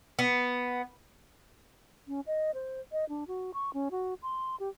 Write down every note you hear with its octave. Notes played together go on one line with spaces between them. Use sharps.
B3
C#4
D#5
C5
D#5
D4
F#4
C#6
C#4
F#4
C6
G4